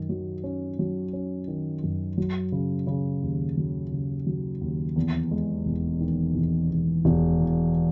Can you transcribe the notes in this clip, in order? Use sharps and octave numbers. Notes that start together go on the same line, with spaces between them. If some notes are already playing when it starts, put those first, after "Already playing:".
Already playing: F#2 D#3
F#3
C#4
F#3
C#4
D#3
F#2
F#3
C#3
C#3
D#2
F#3
C#3
F#3
D#2
E2
G#3
E1
D#3
E1
E1
E1
E2